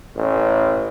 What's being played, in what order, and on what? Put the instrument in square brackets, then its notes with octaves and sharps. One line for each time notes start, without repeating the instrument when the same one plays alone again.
[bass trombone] A1